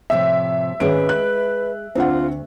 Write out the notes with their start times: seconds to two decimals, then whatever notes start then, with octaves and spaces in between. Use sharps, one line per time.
0.10 A2 C3 F3 E5
0.80 G#1 G#3 C#4 G#4 B4 D7
1.09 F#6
1.95 D2 C4 D4 F4 F#5